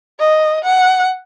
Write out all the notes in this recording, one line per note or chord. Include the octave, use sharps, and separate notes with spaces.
D#5
F#5